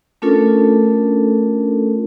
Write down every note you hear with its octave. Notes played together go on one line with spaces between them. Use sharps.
A3 C#4 D4 F4 A4 A#4